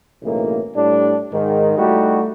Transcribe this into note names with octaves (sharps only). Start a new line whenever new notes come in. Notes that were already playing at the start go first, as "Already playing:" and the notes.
B1 A2 C#3 E3 A#3
A2 G3 D4
G#2 D#3
G3 A3 D#4 E4 F#4 G4